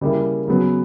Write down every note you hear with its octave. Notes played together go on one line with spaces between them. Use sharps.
C#3 G3 A#3 E4
C#3 F#3 B3